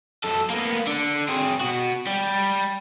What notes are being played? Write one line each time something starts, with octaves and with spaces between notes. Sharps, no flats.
F#2 A4
A#3 B3
D3
C4 G#4
B2 F#4
G3